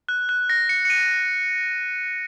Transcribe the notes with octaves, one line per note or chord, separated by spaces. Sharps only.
F#6
F#6
A#6
C#7
C#7
D#7